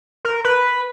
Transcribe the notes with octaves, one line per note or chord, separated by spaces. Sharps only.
A#4
B4